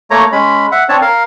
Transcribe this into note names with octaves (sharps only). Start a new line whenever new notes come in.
A3 A#3 C#5 A#5
G#3 C#4 B5
E5 F#5
C4 D4 C#5 A5
A#4 F5